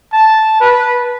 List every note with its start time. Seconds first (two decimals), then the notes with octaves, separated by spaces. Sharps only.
0.13 A5
0.60 B4